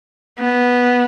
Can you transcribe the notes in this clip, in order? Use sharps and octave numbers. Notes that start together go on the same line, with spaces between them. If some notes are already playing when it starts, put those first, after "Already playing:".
B3